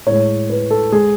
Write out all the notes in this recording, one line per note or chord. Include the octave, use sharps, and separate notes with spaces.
A2 G#3 C#5
B4
A4
G#3 G#4